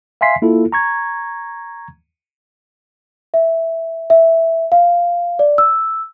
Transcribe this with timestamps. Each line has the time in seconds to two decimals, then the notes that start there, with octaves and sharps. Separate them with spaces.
0.21 E5 F5 G#5 C6 B6 C7
0.42 A#3 E4 F4 A4
0.72 A#5 C#6 G#6
3.34 E5
4.10 E5
4.72 F5
5.39 D5
5.58 E6